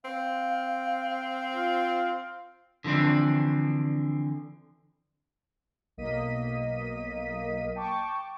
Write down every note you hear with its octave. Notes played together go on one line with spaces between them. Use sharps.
C4 F5
F4
D3 E3 F3 C4 D4
B1 A#3 D#5 B6 D#7
G5 A5 C#6 D6